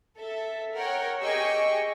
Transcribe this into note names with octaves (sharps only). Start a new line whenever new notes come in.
A4 E5
A#4 C#5 F#5 G5
G4 G#4 D#5 G5 C#6 E6